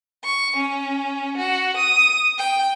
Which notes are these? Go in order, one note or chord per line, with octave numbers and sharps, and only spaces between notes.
C#6
C#4
F#4
D#6
G5